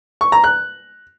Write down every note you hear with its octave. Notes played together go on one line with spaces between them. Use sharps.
C#6
A#5
F#6